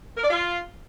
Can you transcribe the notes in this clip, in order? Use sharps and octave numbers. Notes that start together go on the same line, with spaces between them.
A#4
D5
F4